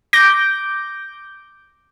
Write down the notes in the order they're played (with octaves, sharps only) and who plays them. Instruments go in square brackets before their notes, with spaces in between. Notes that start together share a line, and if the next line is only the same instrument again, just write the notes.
[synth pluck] D6 G6 A#6